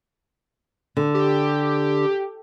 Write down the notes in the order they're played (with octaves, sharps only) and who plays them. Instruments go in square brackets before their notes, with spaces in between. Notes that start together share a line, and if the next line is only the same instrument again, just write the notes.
[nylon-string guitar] D3
[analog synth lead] G4